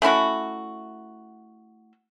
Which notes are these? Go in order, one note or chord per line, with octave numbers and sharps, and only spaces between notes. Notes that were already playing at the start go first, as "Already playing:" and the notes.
A3 C#4 E4 F#4